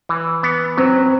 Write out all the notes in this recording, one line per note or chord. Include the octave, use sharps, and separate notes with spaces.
E3
B3
F#3 C4